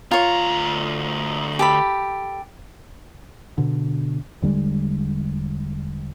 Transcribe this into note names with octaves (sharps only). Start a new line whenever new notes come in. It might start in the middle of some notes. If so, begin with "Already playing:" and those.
D2 F4 C#5 A#5
G4 A4 B5
B2 D3
E1 D3 G3 G#3